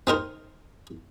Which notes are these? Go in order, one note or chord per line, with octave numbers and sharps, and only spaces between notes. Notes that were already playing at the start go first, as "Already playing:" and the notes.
C4 D#4 A#4 C5